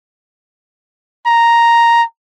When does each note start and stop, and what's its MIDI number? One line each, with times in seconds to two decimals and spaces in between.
1.26 2.03 82